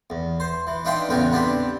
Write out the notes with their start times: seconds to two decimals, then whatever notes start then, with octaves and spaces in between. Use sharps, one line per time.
0.10 E2
0.40 C5
0.67 E3
0.85 D4 D#4 E5 F5 G5 C6
1.09 A1 E2 C#3 B3 G5 G#5
1.32 B3 C4 D4 G4